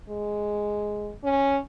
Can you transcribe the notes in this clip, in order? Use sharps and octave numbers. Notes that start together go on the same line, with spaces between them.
G#3
C#4